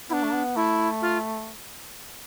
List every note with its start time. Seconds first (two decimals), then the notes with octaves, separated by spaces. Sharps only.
0.10 B3 D4 E4
0.23 A3
0.33 B3
0.56 A3 E4
1.02 F4